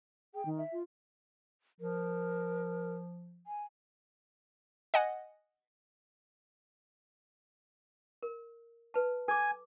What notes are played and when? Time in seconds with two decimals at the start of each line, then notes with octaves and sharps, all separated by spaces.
0.34 G#4 G5
0.45 D#3
0.57 E5
0.73 F4
1.81 F3 A#4
3.47 G#5
4.94 D#5 F#5 G#5
8.23 A#4
8.94 B4 A5
9.28 A4 G#5 D6